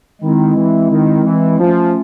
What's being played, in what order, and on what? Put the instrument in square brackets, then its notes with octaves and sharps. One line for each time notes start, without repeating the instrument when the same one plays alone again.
[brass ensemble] D#3 [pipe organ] G#3 C4 E4
[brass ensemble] E3
D#3
E3
[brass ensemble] F3 [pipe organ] A3 C#4 F4